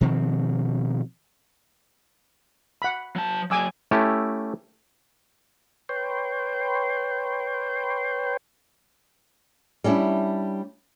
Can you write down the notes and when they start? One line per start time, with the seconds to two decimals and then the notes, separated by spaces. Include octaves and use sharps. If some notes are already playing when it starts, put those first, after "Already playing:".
0.01 B2 D#3 F3 C4
2.82 F#5 B5
3.16 F#3 A5
3.51 F#3 G#4 G#5 D6 E6
3.91 A3 C#4 E4 G4
5.89 B4 C#5 G5 C6
9.84 G3 C#4 D4 E4